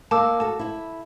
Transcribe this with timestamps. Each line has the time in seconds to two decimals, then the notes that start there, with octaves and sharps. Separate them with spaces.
0.11 A#3 D#4 A5 D6 E6
0.40 F#4 A4 A5
0.59 E4 E5